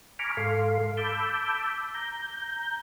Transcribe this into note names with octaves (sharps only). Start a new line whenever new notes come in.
G#5 A#5 B5 C#6 D6 F6
G#2 A4 F5 C6
A5 B5 D6 E6 G6
A#5 G6